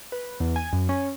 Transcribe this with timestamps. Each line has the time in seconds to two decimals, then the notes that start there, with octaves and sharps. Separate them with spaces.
0.12 B4
0.40 E2
0.56 G#5
0.73 F#2
0.89 C#4